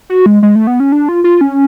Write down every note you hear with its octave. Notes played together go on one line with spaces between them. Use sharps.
F#4
G#3
G#3
A3
B3
C#4
D4
F4
F4
C#4